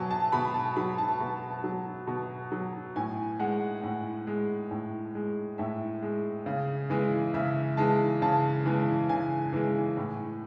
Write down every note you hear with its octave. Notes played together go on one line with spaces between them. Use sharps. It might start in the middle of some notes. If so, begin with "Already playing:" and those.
Already playing: B2 F#3 G#5 A5
A5
B2 B5
A5
F#3 B5
A5
B2
F#3
B2
F#3
A2 G#5
G#3 F#5
A2
G#3
A2
G#3
A2 E5
G#3
C#3
E3 G#3
C#3 E5
E3 G#3 A5
C#3 A5
E3 G#3
C#3 G#5
E3 G#3
A2